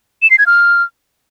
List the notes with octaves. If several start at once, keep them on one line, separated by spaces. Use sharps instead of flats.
E7
C7
G#6
F6